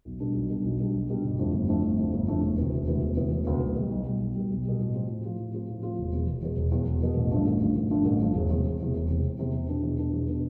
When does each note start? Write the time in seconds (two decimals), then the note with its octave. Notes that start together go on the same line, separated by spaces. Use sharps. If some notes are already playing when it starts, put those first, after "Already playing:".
0.05 B1
0.20 B2 G3 D4
0.35 B1
0.50 B2 G3 D4
0.64 B1
0.79 B2 G3 D4
0.94 B1
1.10 B2 G3 D4
1.24 G1
1.39 F2 D3 A3 E4
1.53 G1
1.68 F2 D3 A3 E4
1.84 G1
1.98 F2 D3 A3 E4
2.13 G1
2.27 F2 D3 A3 E4
2.43 E1
2.57 D2 C3 E3 B3
2.72 E1
2.87 D2 C3 E3 B3
3.02 E1
3.17 D2 C3 E3 B3
3.31 E1
3.46 D2 C3 E3 B3
3.61 B1
3.75 B2 G3
3.90 B1
4.06 B2 G3
4.20 B1
4.35 B2 G3
4.50 B1
4.65 B2 G3
4.80 A2
4.94 F3 C4 F4
5.09 A2
5.24 F3 C4 F4
5.39 A2
5.54 F3 C4 F4
5.69 A2
5.83 F3 C4 F4
5.99 E1
6.13 E2 B2 B3
6.28 E1
6.43 E2 B2 B3
6.57 E1
6.72 E2 B2 B3
6.87 E1
7.01 E2 B2 B3
7.17 A1
7.31 G2 D3 F3 A3
7.46 A1
7.61 G2 D3 F3 A3
7.76 A1
7.91 G2 D3 F3 A3
8.05 A1
8.20 G2 D3 F3 A3
8.35 E1
8.50 E2 C3
8.65 E1
8.80 E2 C3
8.94 E1
9.09 E2 C3
9.24 E1
9.39 E2 C3
9.54 E2
9.68 B2 B3 D4
9.83 E2
9.99 B2 B3 D4
10.14 E2
10.28 B2 B3 D4